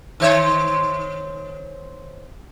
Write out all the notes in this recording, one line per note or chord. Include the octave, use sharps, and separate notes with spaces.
D#3 C5 C#5